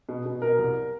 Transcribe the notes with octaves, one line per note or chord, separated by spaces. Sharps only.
B2
B2
B2 A#4
C2